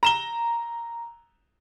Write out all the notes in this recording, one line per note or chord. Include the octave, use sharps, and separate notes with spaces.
A#5 E7 G7